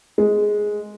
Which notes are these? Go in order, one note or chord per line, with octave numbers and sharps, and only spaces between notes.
G#3